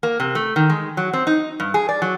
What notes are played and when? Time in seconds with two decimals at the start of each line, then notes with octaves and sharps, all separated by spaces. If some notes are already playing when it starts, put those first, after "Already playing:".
0.03 A#3
0.20 C3
0.35 A3
0.56 D#3
0.70 G#3
0.97 F#3
1.13 C4
1.27 D#4
1.60 G2
1.74 G#4
1.89 D5
2.02 F#3